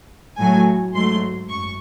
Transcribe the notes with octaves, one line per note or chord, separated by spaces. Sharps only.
A2 F#3 A3 G#5
G#2 F#3 A3 C6
F#2 C#6